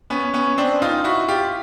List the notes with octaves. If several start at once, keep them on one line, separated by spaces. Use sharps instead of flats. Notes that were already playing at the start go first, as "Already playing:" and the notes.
B3 C#4
B3 C#4
C4 D4
D#4 F4
E4 F#4
F4 G4